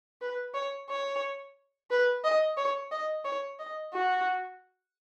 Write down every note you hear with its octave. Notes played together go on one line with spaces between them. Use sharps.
B4
C#5
C#5
B4
D#5
C#5
D#5
C#5
D#5
F#4